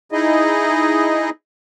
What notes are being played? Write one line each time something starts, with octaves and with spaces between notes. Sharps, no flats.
D#4 E4 G#4 D#5